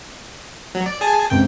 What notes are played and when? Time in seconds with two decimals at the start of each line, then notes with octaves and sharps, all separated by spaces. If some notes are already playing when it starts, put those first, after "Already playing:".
0.75 F#3
0.86 D5
1.01 G#4 G#5 A5
1.30 C2 G#2 C#3 G5